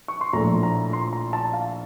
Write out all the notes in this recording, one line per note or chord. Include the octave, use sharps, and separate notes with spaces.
C#6
C6
A#1 A2 F3 A3 A#5
A#5
C6
A#5
A5
F5